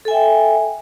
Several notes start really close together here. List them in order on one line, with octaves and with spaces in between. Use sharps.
A4 G#5 E5 G5